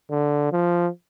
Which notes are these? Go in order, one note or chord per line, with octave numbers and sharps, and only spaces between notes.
D3
F3